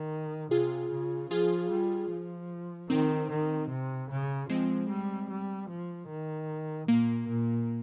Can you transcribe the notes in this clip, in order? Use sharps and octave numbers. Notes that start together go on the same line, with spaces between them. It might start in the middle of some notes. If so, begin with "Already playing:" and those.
Already playing: D#3
C3 F4 G#4
C#3
F3 F4 G#4
G3
F3
D#3 C4 D#4
D#3
C3
C#3
F3 G#3 C4
G3
G3
F3
D#3
A#2 A#3
A#2